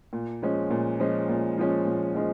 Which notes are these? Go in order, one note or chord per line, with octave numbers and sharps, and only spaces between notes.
A#2
F3 G#3 C#4
A#2
F3 G#3 C#4
A#2
F3 G#3 C#4
A#2
F3 G#3 C#4